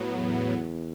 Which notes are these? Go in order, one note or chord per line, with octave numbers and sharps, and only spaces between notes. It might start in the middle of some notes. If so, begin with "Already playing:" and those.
Already playing: A2 F#3 B3
E2